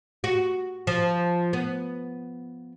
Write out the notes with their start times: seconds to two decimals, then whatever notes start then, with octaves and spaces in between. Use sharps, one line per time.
0.24 F#4
0.87 F3
1.53 B3